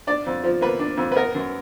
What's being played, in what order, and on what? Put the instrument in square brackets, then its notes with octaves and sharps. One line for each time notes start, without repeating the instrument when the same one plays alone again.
[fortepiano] D4 D5
F2
F3
A#3 B4
D4
F2
B4
B3 A#4
F#2